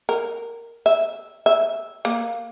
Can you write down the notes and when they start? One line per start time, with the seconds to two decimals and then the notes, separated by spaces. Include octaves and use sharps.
0.09 A#4
0.86 E5
1.46 E5
2.05 A#3